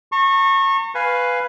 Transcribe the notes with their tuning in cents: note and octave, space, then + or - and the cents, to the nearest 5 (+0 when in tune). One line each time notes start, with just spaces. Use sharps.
A#5 -45 C#6 -25
B4 +5 F5 +0 G#5 +0